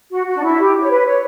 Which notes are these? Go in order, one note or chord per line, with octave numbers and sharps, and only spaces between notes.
F#4
F#4
D4
E4
G4
C#5
B4
C#5